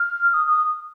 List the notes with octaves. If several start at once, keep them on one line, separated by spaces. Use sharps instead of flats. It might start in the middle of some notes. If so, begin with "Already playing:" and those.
Already playing: F6
D#6
D#6